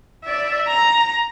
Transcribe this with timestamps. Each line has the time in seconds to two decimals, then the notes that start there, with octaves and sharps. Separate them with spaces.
0.25 D5 E5
0.68 A#5